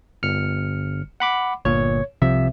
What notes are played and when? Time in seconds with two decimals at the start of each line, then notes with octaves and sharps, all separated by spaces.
0.23 G1 F6 C#7
1.20 F#5 B5 D6
1.65 G1 A#2 C#5
2.22 C2 C3 F3 E5